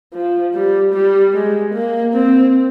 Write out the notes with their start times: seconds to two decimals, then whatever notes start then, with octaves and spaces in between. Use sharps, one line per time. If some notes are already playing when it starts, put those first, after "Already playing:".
0.13 F3
0.54 G3
0.93 G3
1.34 G#3
1.74 A#3
2.14 C4